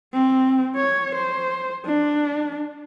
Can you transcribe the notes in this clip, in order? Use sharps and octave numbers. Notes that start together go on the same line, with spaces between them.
C4
C#5
C5
D4